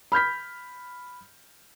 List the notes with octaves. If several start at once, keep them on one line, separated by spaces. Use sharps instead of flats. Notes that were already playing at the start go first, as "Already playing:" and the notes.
B5 F6 G6 B6